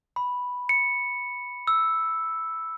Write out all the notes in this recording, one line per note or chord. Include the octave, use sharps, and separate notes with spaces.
B5
C#7
E6